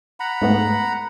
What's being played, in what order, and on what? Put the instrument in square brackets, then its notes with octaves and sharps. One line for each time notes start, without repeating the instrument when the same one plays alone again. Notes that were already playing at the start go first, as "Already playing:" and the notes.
[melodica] F#5 A#5 B5
[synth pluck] G#2 A3 B3